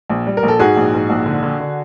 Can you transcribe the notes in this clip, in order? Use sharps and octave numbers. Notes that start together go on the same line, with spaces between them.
A#1
G3
A#4
A#1
A4
G#2 F#4 G#4
A#1
G#2
A#1
D3
D3
D3